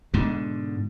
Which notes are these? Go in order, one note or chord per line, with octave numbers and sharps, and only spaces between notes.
G#2 B2 D3